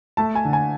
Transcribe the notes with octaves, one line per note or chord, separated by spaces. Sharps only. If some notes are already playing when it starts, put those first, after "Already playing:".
A3 A5
G#5
D3
G#5